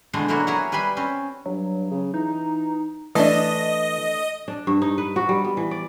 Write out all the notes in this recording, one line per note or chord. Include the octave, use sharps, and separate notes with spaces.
B2 D3 E3 G#3 A3 C4
D3 F#3 A#3 E4 F#4
E4 G#4 A#4 C#5 F#5
G3 B4 G#5 B5 C6
C4 C#4
G2 F#3
C#3
E3 D#4
E3 A3 D4 D#5
D4
G2
D#4
B4
F#4
G3
B3
E3
D5